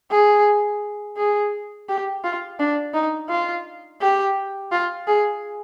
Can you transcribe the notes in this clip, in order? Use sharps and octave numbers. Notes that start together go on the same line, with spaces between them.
G#4
G#4
G4
F4
D4
D#4
F4
G4
F4
G#4